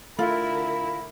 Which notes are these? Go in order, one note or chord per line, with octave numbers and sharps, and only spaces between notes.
D3 A3 E4 F4 A#4 B5